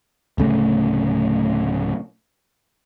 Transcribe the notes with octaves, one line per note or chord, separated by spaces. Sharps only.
D1 C#3 A3